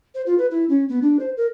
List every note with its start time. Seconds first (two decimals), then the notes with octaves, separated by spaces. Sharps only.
0.15 C5
0.26 F4
0.38 B4
0.51 E4
0.69 C#4
0.89 B3
1.02 D4
1.19 C5
1.37 A#4